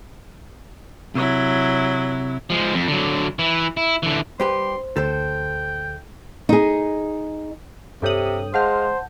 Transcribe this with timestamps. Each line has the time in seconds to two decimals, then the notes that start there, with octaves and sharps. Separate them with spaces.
1.15 C3 F#3 E4
2.50 F3 G#3
2.74 F2
2.88 D3 F#3
3.39 E3 E4
3.77 E4
4.03 D3 E3
4.40 G2 G4 B4 C5 C6
4.96 D2 A4 C5 G5
5.13 G5
6.49 D#4 G#4
8.02 G2 C3 A4 C#5 G5 D#6 F#7
8.54 G#3 C5 F5 F#5 A5 F6 G6